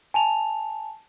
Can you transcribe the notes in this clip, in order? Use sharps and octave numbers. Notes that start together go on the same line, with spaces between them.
G#5 A5 F7